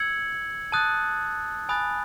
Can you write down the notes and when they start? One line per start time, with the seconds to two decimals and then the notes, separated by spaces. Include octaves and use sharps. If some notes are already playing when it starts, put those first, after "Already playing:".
Already playing: E6 G#6 C#7 F#7
0.72 A5 D#6 F#6 A6
1.69 G#5 B5 D#6 F#6 A6